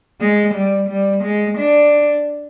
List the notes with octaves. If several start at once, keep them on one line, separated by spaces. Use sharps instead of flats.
G#3
G3
G3
G#3
D4